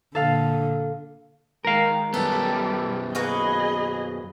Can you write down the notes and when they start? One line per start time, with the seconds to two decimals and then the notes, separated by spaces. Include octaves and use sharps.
0.15 A#2 D3 A4 F5
1.65 D#3 G#3 A#4 F5
2.14 F#2 G3 B3 A4
3.15 A#3 F#4 G#4 B4 D#5